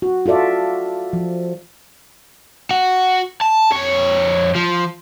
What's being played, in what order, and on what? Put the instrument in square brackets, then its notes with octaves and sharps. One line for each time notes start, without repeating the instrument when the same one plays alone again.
[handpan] F#4
F4 F#4 A4 D5 E5
F3
[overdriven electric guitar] F#4
A5
F2 C#5
F3